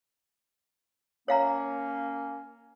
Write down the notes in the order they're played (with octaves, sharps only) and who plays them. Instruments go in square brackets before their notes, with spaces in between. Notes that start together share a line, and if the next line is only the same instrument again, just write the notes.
[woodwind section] A#3 C#4 [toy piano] C#5 F5 A#5